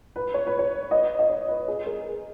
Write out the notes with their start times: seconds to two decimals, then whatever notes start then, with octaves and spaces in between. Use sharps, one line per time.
0.16 B4
0.34 C#5
0.47 B4
0.59 C#5
0.91 D#5
1.19 D#5
1.30 C#5
1.48 B4
1.68 G#4
1.86 A#4